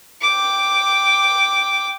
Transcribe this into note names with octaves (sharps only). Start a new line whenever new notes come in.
G5 D6